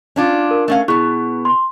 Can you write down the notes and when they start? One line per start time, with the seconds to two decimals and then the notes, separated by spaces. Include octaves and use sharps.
0.16 C#4 D4 F4
0.51 A#4
0.68 A3 C#4 F5
0.88 B2 B3 E4 G#4 C#6
1.45 C6